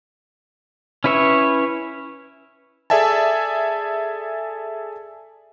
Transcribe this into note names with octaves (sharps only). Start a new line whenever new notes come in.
C#4 E4 B4 C#5 E5
G#4 A4 D5 E5 G#5 A5